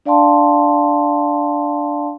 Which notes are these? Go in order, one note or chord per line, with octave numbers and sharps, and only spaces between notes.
D4 D5 F5 G5 A5 C6